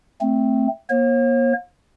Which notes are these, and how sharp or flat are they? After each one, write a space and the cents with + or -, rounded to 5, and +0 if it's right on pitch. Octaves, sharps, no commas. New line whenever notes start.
A3 +5 C4 +0
A#3 +40 C#5 -45